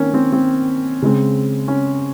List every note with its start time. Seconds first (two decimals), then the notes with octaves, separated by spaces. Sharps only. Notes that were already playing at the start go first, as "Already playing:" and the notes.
Already playing: D#3 A#3 C4 C#4
0.14 C4
0.33 C4
1.02 C#3 G#3 C4
1.68 C#4